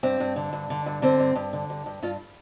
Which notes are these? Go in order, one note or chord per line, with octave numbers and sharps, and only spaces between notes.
G2 C4
G2
D3
G2
D3
G2
D3 C4
G2
G2
D3
G2
G2
G2 F4